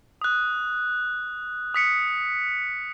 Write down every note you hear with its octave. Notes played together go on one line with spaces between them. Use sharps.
D#6 F#6
D#6 B6 C#7